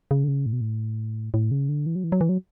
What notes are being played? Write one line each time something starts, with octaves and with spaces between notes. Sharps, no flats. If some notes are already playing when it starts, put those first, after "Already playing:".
C#3
D3
C#3
A2
B2
A2
A2
C#3
D3
E3
F#3
E3
F#3
E3
F#3